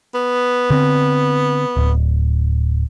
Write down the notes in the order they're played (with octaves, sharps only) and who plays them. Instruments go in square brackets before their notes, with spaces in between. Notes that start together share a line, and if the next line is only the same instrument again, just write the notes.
[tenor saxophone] B3
[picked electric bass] D3 C4
D1